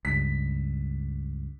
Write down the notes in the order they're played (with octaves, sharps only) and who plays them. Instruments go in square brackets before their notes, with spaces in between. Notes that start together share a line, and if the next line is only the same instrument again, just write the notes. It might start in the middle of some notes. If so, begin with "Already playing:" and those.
[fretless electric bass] C#2 G2 [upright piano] B6